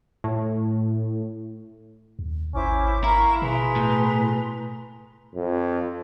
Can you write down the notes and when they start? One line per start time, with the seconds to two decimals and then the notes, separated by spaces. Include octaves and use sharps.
0.24 A2
2.19 D#2
2.54 G#1 C#4 E4 C5 D6
3.04 E4 A#4 F5 A#5 C#6
3.42 B2 G#4 B4 A#5 C6
3.76 A2
5.35 F2